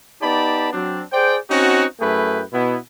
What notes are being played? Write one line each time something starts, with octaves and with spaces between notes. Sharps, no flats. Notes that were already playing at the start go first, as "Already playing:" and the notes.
B3 D#4 G4 D5 A5 B5
F#3 C4 D4
G#4 C5 D5 G5
C4 C#4 D#4 F#4
F#2 A3 E4 G#4 B4 G5
B2 B3 E4